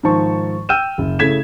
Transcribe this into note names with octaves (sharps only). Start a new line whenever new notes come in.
G#2 D#3 F3 C5 A5 C#6
G5 E6 F6 G6 D#7 E7
F#1
C#3 A3 E4 G#6 B6 E7